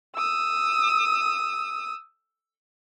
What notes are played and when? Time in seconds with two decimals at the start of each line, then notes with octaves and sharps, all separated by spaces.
0.16 D#6 E6